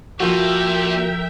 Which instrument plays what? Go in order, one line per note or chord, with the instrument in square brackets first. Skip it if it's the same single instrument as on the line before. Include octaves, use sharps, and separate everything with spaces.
[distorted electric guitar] A#2 [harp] F3 A4 [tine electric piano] F4 F#4 [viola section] A#4 E5 G5